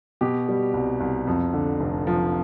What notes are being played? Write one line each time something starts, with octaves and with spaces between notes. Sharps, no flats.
B2 G4
G3
C2
C2
F2
D3
F1
F3